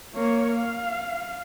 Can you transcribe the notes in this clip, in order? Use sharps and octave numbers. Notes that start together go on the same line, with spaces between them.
A#3 C#5
F5